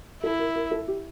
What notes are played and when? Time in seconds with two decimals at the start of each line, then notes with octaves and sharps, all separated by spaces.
0.23 E4 A4
0.39 A#4
0.56 A#4
0.71 A4
0.88 G4